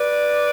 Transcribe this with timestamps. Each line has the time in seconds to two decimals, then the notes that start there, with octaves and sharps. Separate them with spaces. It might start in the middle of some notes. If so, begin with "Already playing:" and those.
Already playing: B4 D5